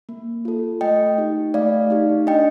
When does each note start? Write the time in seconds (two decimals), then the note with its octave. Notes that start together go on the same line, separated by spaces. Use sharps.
0.09 A#3
0.45 F4 A4
0.81 A3 D#5 G5
1.18 D#4 G4
1.54 A3 D5 F5
1.90 D#4 G4
2.27 D4 D#5 G5